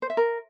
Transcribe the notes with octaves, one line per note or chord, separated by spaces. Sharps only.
C5
E5
A#4